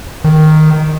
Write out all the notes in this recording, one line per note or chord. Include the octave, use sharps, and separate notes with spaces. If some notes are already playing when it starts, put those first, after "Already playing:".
D#3